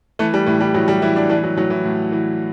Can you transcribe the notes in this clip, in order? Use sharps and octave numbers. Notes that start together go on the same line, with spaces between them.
E3 A3
G3
A2 E3
G3
A2 F#3
G3
E3 E4
D4
E3 D4
F#3
A2 F#3
E3
A2
E3